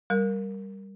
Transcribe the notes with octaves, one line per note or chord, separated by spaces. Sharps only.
G3 A#4